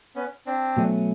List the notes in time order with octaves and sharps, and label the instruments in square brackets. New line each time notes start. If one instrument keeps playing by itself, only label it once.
[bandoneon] B3 C#4
C4 D4
[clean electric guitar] B2 F#3 A3 C#4